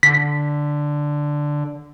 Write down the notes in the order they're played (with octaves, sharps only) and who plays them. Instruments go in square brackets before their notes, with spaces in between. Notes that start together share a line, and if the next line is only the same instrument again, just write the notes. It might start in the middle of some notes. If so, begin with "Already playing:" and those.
[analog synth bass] D3 [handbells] B6